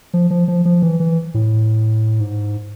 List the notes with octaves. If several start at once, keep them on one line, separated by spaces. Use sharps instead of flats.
F3
F3
F3
F3
E3
E3
A2
G#2